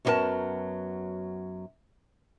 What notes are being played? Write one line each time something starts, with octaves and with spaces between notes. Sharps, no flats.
F#2 F#3 G#3 B3 A#4 A5